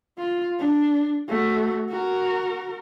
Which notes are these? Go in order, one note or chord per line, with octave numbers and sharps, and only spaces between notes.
F4
D4
A3 F#4
F#4 A#4